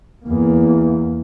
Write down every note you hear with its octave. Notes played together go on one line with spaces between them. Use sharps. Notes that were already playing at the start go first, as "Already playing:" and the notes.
E2 A#3